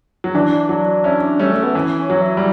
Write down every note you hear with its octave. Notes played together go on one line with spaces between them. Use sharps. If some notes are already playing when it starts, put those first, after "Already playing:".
F#3
E3 D4
F#3
C#4 E4
G3 A3 C#4
A3
B3
E3 C#4
C#4
F#3
E4
G3